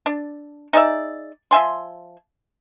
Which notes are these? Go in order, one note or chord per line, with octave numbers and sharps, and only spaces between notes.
D4
D#4 G#4 D5 E5
F3 E5 G#5 C6